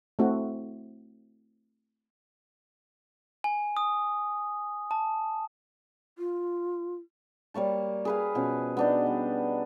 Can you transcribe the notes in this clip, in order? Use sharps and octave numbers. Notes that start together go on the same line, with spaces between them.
A3 C4 E4 F#4
G#5
D#6
A5
F4
G3 A#3 C#5 A5
G#4 B4 F5
B2 F3 C#4 F#4
B3 D4 D#4
G3